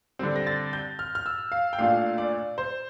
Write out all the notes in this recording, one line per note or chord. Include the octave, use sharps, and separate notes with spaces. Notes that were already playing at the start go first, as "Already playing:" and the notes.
D3 G3 C4
A#6
A6
G6
F6
F6
E6
F5
G5
A#2 A3 D4 F4 F5
D5
C5